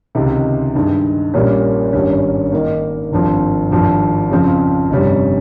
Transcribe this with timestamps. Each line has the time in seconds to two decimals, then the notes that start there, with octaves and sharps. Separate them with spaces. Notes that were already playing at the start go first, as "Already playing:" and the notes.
0.15 C#2 C3 D#3
0.75 G2 D#3 G#3
1.34 A#1 A#2 G3 A#3 C#4
1.93 G#1 G2 G3 C#4
2.52 G#2 D#3 A#3
3.12 G#1 G2 F3 C4
3.71 G#1 G2 F3
4.31 F2 C#3 F3 C4
4.90 G1 F2 C3 G3 C#4